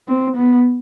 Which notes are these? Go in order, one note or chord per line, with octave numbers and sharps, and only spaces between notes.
C4
B3